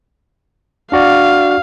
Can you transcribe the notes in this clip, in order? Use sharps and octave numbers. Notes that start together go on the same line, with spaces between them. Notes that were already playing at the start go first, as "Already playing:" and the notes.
D4 F#4 D5 F5